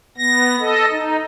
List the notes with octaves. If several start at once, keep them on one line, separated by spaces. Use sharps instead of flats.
B3 A#6
A4 D#5
D#4